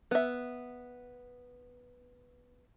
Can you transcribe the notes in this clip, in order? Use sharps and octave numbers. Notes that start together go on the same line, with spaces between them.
B3 E5